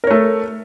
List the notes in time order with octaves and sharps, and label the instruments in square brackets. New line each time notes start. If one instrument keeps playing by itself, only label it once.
[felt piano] A#4
C#5
A3
A4